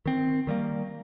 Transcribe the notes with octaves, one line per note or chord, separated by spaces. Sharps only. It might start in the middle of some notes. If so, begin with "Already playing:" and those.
D#3 C4
D#3 G3 A#3